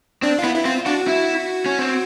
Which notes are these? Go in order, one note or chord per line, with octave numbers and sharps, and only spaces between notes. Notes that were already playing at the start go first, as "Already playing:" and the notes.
C4 D4
F4
B3 E4
E4
C4 F4
D4 F#4
E4
C#4
C4